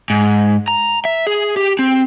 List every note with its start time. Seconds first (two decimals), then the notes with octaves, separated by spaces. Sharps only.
0.10 G#2
0.68 A#5
1.05 E5
1.27 G#4
1.57 G4
1.79 C4